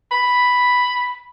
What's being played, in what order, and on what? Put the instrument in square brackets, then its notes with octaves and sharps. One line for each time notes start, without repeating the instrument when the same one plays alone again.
[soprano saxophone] B5